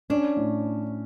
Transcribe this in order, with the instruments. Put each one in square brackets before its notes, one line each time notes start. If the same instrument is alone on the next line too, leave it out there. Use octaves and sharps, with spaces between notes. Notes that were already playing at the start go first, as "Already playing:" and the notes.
[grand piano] C#4 [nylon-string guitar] D4
[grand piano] A2